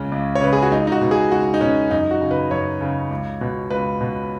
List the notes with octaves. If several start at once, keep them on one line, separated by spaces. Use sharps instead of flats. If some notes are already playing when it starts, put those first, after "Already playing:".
Already playing: C#2 C#3 C#4
C#2
C#5
C#3 B4
G#4
F#4
C#2 D#4
D#4
F#4
B2
G#4
C#2 F#4
D#4
B2 C#4
F#2 D#4
F#4
C#3
B4
F#2 C#5
C#3
C#2
B2
C#2 B4
B2